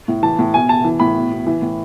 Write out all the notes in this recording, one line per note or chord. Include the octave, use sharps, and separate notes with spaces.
A2
E3 A5
A2
B2 G#5
B2 A5
E3
A2 B5
B2
B2
E3
A2